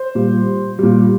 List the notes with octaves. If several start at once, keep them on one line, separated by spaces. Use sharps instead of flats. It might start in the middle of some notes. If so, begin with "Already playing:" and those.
Already playing: C5
A#2 G3
A#2 G3